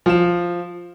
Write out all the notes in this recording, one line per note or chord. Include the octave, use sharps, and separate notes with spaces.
F3 E7